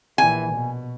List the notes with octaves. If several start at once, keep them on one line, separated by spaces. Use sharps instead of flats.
A#1 E3 G#5
B2